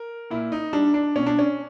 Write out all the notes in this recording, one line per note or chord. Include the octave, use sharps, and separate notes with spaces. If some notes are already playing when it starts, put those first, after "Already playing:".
Already playing: A#4
A#2 E4
D#4
G3 D4
D4
B2 C#4
D4
C#4